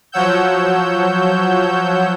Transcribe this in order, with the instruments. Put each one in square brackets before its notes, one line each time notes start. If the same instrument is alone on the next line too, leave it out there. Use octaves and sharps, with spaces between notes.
[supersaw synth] F3 F#3 C#5 F#5 E6 G6